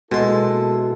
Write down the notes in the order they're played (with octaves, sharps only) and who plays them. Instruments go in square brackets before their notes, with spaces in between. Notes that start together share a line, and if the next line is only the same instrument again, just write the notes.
[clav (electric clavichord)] B2 [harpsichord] G#3 C6 [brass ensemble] A#3 E4 A4